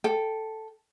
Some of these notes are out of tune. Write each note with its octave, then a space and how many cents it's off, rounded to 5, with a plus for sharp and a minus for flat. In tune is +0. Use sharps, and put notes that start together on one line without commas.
A4 +0 G5 +0